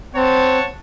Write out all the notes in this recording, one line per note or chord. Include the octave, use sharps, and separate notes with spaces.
C4 C#5 F#5 A5